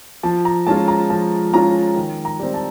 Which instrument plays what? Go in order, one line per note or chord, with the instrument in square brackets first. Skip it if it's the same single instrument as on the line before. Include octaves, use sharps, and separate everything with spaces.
[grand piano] F3 A5
A#5
G#3 C#4 F4 A5
A#5
F3 A5
G#3 C#4 F4 A#5
D#3
A#5
G3 C4
A5